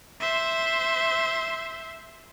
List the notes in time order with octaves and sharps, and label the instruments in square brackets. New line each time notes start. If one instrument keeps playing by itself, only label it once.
[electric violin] C5 E5